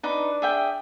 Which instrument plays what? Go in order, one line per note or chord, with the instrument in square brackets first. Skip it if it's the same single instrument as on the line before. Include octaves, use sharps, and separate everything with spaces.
[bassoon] D4 [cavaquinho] D#4 B4
[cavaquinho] G#4 E5 G5